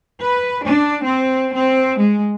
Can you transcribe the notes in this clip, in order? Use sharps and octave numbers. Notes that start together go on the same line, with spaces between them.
B4
D4
C4
C4
G#3